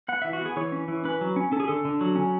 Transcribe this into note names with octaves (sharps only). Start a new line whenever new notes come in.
B3 F#5
E3 E5
F#4
B3 G#4
E3 C#5
C#4
E3
C#4 B4
F#3
C#4
C#4 A4
G#4
D3 A4
D3
F#3
C#4